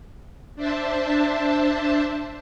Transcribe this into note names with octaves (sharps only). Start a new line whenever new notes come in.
D4 C5 E5 A5